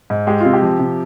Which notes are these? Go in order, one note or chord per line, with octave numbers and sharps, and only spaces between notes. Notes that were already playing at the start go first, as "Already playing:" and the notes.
G#2
G#3 G4
C3 F4
G4
F3
C3